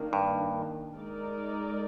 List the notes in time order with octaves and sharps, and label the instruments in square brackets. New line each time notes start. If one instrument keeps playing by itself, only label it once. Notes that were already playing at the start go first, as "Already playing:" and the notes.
Already playing: [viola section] D#3 A#3 D4
[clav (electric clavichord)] G2
[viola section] G#3 D#4 A#4 D5